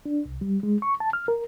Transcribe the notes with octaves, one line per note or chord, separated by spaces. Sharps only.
D4
C2
G3
G#3
C#6
A5
F6
A#4